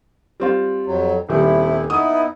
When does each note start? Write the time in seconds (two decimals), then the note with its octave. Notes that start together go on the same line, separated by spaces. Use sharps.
0.40 G3 C4 F4
0.87 F2 F#3
1.29 D#1 C3 G3 E4
1.90 B3 D#4 E4 D#6